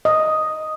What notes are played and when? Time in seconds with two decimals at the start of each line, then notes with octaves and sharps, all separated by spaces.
0.05 D#5